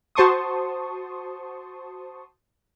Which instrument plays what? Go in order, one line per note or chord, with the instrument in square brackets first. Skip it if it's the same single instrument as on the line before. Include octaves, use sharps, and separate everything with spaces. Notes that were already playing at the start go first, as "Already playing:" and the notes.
[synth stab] F#4 C5 A5 C6 C#6 D#6